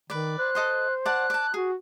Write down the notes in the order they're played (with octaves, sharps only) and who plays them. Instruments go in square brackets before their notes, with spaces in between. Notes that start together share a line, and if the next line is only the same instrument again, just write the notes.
[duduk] D#3 [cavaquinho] B4 D5
[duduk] C5 [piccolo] F#6
[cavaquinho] A4 D#5 C6
[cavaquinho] D5 F#5 A5 [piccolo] F#6
[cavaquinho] D5 A5
[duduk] F#4 [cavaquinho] G#4